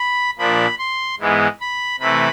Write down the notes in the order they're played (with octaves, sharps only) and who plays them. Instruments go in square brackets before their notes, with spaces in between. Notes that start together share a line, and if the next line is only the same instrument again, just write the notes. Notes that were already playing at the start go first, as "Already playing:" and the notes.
Already playing: [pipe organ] B5
A#2 F3 A#3 D4 B5
C6
G#2 E3 G#3 B3
B5
C3 E3 A3 B5